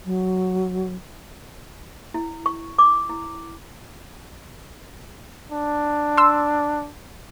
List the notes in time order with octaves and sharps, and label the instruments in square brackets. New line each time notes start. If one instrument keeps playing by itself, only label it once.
[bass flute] F#3
[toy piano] E4
C#6
D6
E4
[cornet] D4
[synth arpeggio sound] C6 E6